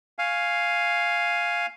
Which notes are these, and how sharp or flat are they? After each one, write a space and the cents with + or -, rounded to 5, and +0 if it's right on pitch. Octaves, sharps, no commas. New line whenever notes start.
F5 +0 G#5 +0 C#6 +0